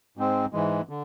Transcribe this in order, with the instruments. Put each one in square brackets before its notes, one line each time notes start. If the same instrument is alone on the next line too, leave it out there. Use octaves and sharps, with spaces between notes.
[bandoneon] G#2 G#3 C4
G#2 E3 G#3
D3